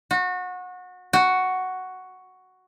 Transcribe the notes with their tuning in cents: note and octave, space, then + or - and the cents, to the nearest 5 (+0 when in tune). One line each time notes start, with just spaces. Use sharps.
F#4 -25
F#4 +5